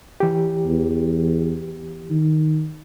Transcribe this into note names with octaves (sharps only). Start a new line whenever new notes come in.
E3 G4
E2
D#3